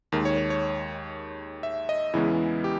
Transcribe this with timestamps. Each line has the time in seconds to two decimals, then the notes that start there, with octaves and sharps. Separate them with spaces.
0.12 D#2 D#3 G#3 A#4
0.25 C#5
0.37 C#5
0.50 C#5
1.63 E5
1.89 D#5
2.13 E2 C#3 E3 G#3 B3 E4
2.64 G4